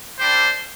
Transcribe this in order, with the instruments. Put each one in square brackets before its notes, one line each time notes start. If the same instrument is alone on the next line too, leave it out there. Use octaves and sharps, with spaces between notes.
[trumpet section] G3 D4 G4 C5